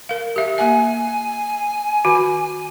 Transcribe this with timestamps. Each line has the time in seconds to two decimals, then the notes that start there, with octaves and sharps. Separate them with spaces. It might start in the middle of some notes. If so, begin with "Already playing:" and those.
0.09 A#4 F5
0.36 G4 E5 F5
0.58 A#3 E5 G#5
2.05 D#3 F#4